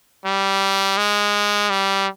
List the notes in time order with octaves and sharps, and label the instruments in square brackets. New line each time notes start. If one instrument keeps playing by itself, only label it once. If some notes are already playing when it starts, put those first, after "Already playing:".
[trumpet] G3
G#3
G3